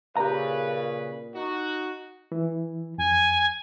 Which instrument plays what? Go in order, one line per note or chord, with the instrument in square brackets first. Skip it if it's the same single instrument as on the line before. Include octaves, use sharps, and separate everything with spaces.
[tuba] A#2 [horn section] C#3 B4 [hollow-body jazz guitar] G4 A#5
[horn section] D#4 F#4
[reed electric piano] E3
[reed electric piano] F2 [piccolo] G#5